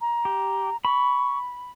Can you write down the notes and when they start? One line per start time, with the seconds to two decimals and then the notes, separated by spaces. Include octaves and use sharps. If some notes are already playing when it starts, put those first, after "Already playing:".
0.01 A#5
0.25 G4
0.85 B5 C#6